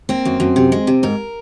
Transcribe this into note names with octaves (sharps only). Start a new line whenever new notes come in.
A#3 C4
F#2
F#2
C3
G#3
C3
G#2 A#4